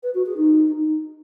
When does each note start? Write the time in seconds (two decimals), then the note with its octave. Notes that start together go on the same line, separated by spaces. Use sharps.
0.03 B4
0.15 F#4
0.26 G#4
0.37 D#4